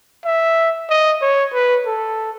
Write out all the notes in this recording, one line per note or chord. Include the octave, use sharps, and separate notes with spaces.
E5
D#5
C#5
B4
A4